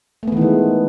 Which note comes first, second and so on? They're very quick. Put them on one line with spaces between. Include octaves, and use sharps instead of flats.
A3 B3 E3 D#3 G#3